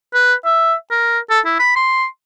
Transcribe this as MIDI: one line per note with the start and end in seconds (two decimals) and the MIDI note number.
0.14 0.33 71
0.45 0.74 76
0.91 1.19 70
1.30 1.40 69
1.46 1.59 64
1.59 1.75 83
1.76 2.06 84